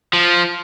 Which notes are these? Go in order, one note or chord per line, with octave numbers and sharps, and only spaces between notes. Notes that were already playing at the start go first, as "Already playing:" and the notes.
F3